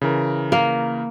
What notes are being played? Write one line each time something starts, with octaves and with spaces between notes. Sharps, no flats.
C#3 E3 A#4
A#3